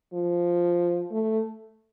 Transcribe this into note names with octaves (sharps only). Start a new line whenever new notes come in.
F3
A3